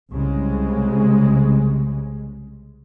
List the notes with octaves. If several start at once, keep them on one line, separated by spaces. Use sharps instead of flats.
C2 C#3 G#3